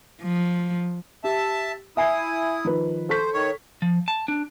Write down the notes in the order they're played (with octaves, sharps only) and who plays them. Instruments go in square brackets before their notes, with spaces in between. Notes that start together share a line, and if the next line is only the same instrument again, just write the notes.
[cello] F3
[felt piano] G4 [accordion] E5 A5
[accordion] E4 D#6 [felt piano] E5 G#5 C7
[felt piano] D#3 F3 B4
[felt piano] A4 C#6 B6 [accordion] C5
[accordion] D#3 C#5
[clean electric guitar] F3
A5
D4